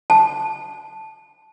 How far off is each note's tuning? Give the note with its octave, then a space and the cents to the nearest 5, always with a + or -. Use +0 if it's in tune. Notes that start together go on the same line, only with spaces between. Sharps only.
A5 -5